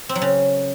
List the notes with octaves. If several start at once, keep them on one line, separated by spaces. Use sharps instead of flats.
C4
F#3
C#3